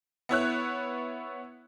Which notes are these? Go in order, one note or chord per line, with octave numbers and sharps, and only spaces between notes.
B3 E4 C#5 F#6